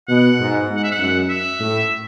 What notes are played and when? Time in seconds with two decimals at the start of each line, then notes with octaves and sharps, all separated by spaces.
0.08 B2 F#5
0.39 G#2
0.69 G#2
0.76 F#5
0.84 E5
0.92 F#5
0.99 F#2
1.29 E5
1.59 A2